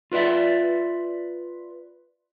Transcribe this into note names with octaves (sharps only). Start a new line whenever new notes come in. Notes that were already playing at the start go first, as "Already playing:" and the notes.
F4 B4 D5 E5